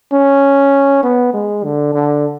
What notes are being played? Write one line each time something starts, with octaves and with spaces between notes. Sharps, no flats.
C#4
B3
G#3
D3
D3